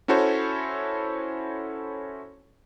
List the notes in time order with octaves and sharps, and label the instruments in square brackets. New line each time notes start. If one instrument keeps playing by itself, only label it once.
[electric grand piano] C#4 E4 F#4 A4 C5 C#5